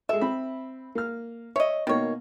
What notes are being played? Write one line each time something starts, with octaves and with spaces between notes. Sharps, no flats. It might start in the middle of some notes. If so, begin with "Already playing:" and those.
G#3 A4 E5
C4 B5
A#3 F6
C#5 D#5 E5
B2 D#3 A#3 C#5